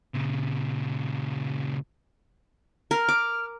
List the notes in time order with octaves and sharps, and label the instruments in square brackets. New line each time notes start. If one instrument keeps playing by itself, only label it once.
[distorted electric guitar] A#2 C#3
[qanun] A#4 [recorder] F6
[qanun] D6